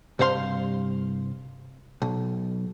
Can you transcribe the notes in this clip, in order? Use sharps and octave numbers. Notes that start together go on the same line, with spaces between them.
C2 G2 C5 F5 C6
B1